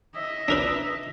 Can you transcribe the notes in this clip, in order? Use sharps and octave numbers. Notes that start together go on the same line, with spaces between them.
D#5 E5
D4 A#4 B4